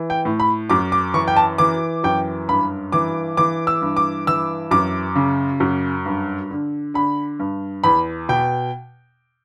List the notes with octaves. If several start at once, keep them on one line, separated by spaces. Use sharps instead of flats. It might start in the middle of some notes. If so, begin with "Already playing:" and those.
Already playing: E3
G5
A2
B5
F#2 D6
D6
E3 C#6
G5
A5
E3 D6
F#2 G5
G2 B5
E3 D6
E3 D6
E6
G2
D6
E3 E6
F#2 D6
C#3
F#2
G2
D3
D3 B5
G2
E2 B5
B2 G5